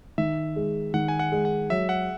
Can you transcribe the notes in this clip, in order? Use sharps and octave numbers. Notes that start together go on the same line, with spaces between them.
D#3 E5
G#3
D#3 F#5
G#5
F#5
G#3
F#5
F#3 E5
F#5